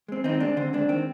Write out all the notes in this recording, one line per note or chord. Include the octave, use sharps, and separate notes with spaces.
G#3 C4
D#3 C4 D#4
G#3 C4 D4
D3 C4
G#3 C4 D4
D#3 C4